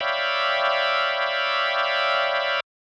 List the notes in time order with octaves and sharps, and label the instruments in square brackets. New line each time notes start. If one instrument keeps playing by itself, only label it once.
[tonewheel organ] C#5 D5 E5 F5 G5 B5